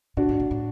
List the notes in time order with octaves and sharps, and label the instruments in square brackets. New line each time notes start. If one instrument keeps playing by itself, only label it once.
[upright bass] A#2 [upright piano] D4 F#4
[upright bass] A2
A#2
A2